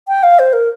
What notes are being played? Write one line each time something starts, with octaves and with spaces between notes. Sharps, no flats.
G5
F5
C5
A#4